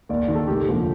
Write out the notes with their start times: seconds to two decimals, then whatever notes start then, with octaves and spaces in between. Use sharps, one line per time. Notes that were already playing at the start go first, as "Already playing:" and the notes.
0.09 D#2 D5
0.28 D#3
0.35 A4
0.48 F1 G4
0.68 D#2 D3 F3